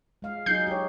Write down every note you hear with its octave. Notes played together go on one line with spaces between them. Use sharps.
G#3 F5
F#3 D#4 G#4 G6 C7
G4 C#5